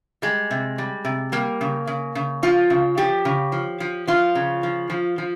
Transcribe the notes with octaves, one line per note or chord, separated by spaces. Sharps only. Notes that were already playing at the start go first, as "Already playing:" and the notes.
G3 G#3
C3
G3
C3
G3 A#3
C#3
C#3
C#3
F3 F4
C#3
F3 G4
C#3
F3
F3
F3 F4
C#3
F3
F3
F3